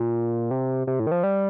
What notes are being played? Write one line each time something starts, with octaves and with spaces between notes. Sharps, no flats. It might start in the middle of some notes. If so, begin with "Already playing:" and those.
Already playing: A#2
C3
C3
A2
D#3
F3
G3